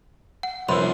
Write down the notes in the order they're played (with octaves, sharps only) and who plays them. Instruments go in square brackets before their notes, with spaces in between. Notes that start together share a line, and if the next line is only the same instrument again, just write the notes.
[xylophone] F#5
[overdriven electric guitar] C2 F3 [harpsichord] F#2 [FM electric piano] B4 C5 E5 [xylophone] C6